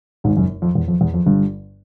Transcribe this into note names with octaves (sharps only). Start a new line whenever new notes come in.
G#1 G#2
F#1 F#2
F2
E2
F2
E2
F2
G1 G2